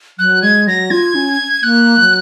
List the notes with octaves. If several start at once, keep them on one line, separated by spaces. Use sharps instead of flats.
F#3 F#6
G#3 G#6
F#3 A#6
F4 G#6
C#4
A#3 F#6
F#3